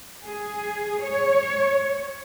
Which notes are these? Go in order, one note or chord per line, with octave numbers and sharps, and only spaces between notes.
G#4
C#5